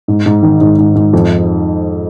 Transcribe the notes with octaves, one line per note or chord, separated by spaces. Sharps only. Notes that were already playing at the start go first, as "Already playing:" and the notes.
G#2
G#2
D#3
G#2
G#2
G#2
F2